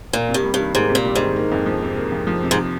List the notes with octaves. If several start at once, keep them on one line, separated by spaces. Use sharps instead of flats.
A#2 A#3
C3
G2
G3
G2
D#3
G#2 A#3
C3
A#2
G3
G#2
D#3
A#3
F2
F3
C3
A#3
F2
F3
C3
G#2